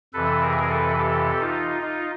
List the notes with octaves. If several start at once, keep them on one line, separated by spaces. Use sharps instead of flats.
F2 C3 E3 A4 B4
G#4 A#4
A4 B4
G4 A4
D#4 F4
D#4 F4